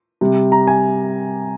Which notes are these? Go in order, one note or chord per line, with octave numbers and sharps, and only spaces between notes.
C3 G3
A#5
G#5